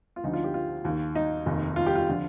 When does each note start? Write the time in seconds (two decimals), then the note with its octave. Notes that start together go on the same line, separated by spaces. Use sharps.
0.16 F4
0.24 D2 D3 F3 D#4
0.33 F4
0.44 G4
0.54 F4
0.85 D#2 D#3
1.15 D#4
1.46 F1 D#2 D#3
1.76 F4
1.86 G4
1.96 F4
2.09 D3 F3